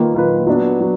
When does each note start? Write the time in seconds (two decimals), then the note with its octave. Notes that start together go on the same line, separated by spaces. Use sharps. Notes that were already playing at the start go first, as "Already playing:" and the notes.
Already playing: D#3 A#3 F4 B4
0.14 D#3 A#3 F4 B4
0.47 F#3 B3 D4
0.80 F#3